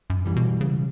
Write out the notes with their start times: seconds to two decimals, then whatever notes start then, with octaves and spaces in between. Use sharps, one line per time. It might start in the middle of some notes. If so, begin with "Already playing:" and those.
0.10 F#2
0.25 B1 E3 G3
0.36 B2
0.61 C#3